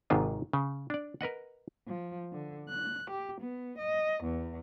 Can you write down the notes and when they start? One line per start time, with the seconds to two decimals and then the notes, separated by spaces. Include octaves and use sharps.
0.10 G#1 G#2 C3 D#3 F4
0.53 C#3
0.90 D4 D5
1.21 A#4 B4 D#5 F#5
1.87 F3
2.32 D3
2.68 F#6
3.10 G4
3.40 B3
3.78 D#5
4.23 E2